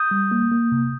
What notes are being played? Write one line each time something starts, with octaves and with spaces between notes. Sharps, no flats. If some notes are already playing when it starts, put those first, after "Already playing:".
Already playing: D#6 G6
G3
A#3
A#3
C3